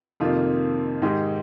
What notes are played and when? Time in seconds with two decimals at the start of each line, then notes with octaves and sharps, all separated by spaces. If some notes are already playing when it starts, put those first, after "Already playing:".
0.20 F2 C3 D#3 A#3 F4
1.02 G#2 D#3 G#3 D#4 G4